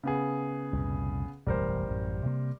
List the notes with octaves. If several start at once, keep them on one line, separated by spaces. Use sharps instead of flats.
C#3 B3 G#4
C2 F2 A#2
E1 A1 F#2 G3 A#4 C5
A1 F#2
C3 A#3